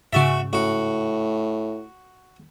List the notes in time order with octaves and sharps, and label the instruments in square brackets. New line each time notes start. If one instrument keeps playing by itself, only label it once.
[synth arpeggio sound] G#2 C#3 [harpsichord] F#4 E5
[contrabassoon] A2 [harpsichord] F#4